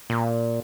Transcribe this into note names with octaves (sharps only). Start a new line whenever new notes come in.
A#2